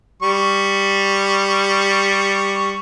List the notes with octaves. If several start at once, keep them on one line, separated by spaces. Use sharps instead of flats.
G3 C#6